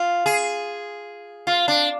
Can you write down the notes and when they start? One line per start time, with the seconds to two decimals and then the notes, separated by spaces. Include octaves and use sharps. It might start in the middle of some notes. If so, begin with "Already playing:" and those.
Already playing: F4
0.26 G#4
1.47 F4
1.68 D4